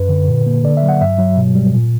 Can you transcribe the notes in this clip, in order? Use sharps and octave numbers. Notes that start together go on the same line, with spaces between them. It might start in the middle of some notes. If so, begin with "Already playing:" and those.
Already playing: F#2 B4
D3
A#2
A#3
D3 D5
E5
F#3
F#5
G2 E5
F#3
B2
G3
A#2